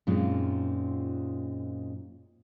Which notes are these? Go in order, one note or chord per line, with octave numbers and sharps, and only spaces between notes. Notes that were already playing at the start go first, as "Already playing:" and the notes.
F#2 A#2 G#3 C4 D#4 F4